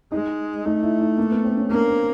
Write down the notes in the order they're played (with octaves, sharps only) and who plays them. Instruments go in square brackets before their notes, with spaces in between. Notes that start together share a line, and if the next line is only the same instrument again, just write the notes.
[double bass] G#3 [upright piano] D#4
[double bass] A3 [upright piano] D#4
[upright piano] E4
D#4
A#3
B3
C4
C#4
[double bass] A#3 [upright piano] D4
[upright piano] C4